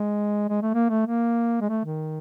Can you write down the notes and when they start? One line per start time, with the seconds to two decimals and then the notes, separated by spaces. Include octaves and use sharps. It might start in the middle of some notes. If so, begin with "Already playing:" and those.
Already playing: G#3
0.49 G#3
0.62 A3
0.74 A#3
0.89 A3
1.06 A#3
1.61 G#3
1.69 A3
1.85 D#3